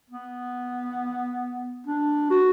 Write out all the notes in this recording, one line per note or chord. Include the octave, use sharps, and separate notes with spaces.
B3
D4
F#4